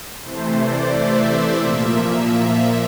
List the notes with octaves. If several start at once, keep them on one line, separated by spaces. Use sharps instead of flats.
C3 E3 A3 C5
D5
E5
A#2 F3 A#3
E5